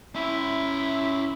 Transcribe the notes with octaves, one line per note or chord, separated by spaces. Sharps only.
C#4 E4 E5